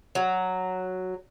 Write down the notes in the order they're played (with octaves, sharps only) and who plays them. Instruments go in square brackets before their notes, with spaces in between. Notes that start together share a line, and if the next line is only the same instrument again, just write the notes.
[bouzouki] F#3